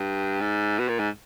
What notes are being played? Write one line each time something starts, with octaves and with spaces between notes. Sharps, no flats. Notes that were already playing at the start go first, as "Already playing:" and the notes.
Already playing: G2
G#2
B2
A#2
G#2